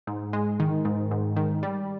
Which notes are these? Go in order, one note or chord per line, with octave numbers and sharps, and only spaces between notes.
G#2
G#3
D#3
G#2
G#2
D#3
G3